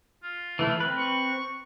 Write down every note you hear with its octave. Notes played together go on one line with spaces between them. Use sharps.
F4
E3 A3 E4
C4 B4
C#6